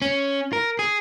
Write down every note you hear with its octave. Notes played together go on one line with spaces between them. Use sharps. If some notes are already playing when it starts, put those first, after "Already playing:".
C#4
A#4
G#4